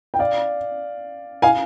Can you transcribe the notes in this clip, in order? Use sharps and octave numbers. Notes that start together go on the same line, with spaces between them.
G5
D5 F5
F5 G#5